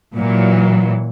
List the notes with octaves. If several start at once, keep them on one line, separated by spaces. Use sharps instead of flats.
A#2 E3 F#3